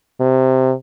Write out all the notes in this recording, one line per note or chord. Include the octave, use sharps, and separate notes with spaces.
C3